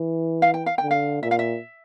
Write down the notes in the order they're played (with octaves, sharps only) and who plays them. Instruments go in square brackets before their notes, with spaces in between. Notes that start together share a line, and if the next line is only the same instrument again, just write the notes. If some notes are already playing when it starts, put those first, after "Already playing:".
Already playing: [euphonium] E3
[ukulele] F5
G5
F5
[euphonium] D3 [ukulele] G5
[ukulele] F5
[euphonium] A#2 [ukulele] E5
[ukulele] F5
E5